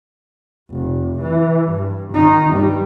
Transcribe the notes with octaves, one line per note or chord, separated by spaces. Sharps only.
F1
E3
G2
D#3 D#4
G2 G3